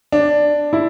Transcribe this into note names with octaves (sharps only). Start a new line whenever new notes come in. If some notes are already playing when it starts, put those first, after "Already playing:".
D4
E4